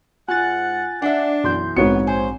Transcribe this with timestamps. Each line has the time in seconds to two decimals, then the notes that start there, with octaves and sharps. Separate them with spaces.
0.28 G#2 F4 F#5 G#5 F#6 A6
1.02 D4 E5 F#5
1.44 B1 F#2 E3 C6 G6
1.76 A#1 G#2 B3 C4 F#4 C#5 C#7
2.07 C5 G#5